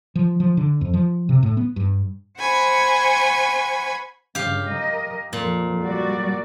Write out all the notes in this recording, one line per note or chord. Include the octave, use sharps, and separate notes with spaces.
F3
F3
D3
F2
F3
C3
A2
B3
G2
C5 F#5 G#5 B5 C#6
G2 C#3 G4 F5
A#4 D#5
F2 A#2
G3 F#4 D5